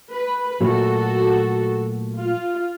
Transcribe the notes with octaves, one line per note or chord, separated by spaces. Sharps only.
B4
A#2 F#3 A3 F#4 A4
F4